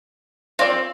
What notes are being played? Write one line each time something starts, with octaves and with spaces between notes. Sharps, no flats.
C4 F4 D5